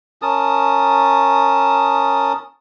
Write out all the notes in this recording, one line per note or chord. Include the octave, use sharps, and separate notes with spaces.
C#4 A#4 A5 D#6